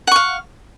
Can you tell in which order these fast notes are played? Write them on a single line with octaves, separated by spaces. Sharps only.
F#5 C#6 F5